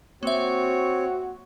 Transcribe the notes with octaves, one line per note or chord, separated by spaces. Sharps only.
A#3 C4 F#4 C#5 E5